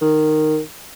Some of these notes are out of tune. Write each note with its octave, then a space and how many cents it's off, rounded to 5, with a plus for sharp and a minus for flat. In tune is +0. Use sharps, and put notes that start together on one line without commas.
D#3 -10